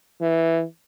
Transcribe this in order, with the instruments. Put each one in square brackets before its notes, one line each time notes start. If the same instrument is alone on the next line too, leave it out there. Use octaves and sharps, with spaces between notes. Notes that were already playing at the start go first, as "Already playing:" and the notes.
[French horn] E3